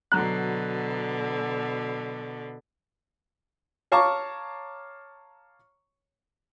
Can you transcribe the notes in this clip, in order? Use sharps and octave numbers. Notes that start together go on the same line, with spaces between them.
B2 D3 F#3 A#5 F#6
C#5 F5 A5 A#5 C#6 D6